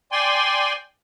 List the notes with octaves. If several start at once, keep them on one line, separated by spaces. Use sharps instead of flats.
D5 G5 G#5 C6